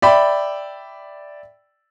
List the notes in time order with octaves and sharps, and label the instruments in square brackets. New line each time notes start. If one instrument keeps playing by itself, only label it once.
[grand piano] D5 E5 G5 B5